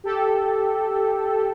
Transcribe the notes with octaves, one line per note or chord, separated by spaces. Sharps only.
G4 A4